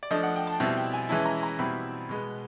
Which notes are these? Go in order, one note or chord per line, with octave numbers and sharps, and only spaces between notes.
D5
F3 A3 D4 D#5
F#5
G5
A5
B2 G3 C4 E4
G5
G#5
E3 G#3 C#4 E4 A5
A#5
A#5
B2 G3 C4 E4 B5
B2 G#3 B3